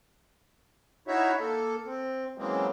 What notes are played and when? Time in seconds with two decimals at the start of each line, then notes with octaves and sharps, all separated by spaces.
1.08 D#4 E4 F#4 C#5 E5
1.40 A#3 A4
1.86 C4
2.38 C#3 E3 F#3 G#3 A#3 C4